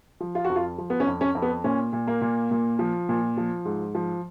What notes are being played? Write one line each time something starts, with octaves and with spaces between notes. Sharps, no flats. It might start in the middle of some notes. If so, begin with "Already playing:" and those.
F3
F4
F2 F#4
F4
F3
B3
C#4
F2
C#4
F2
B3
A#2 C#4
A#2
A#3
A#2
A#2
F3
A#2
F3
G#2
F3